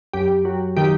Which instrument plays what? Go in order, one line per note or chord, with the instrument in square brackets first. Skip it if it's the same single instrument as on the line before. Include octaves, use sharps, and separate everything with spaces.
[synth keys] F#2 G4
F#3
D#3 G4